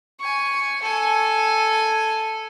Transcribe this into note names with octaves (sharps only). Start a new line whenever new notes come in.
G#5 C#6
A4 G#5